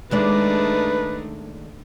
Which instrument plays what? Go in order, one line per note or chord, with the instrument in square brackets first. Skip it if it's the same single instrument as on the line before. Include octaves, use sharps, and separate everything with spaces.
[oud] D#2 G#3 D5 [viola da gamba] A3 D4 D#4 [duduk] B4